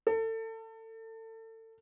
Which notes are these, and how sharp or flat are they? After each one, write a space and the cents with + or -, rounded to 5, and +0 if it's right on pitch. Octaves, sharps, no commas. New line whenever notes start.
A4 +30